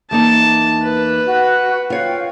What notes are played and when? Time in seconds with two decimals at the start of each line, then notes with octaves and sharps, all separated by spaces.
0.11 E2 A#3 D#4 A5
0.83 B4
1.25 F#4
1.90 F4 C#5 F5 G5